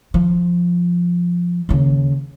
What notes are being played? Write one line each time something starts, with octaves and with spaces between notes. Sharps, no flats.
F3
D#2 C#3